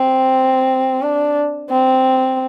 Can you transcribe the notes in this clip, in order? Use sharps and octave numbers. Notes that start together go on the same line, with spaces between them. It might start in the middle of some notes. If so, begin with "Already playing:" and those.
Already playing: C4
D4
C4